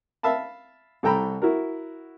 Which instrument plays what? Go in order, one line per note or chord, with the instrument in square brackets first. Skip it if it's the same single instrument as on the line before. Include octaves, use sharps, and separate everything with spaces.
[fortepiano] E5 F5 A5 B5
C2 A4 G5 A#5 B5
E4 F#4 A#4